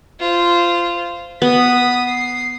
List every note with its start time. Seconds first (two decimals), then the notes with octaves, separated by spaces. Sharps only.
0.19 F4 C5
1.42 B3 D#6 B6
2.08 C7